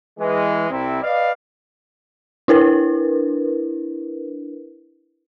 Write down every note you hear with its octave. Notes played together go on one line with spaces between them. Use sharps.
E3 G#3
C2 C3 G3 C4 E4
B4 D5 D#5 F5
D4 E4 A#4 B4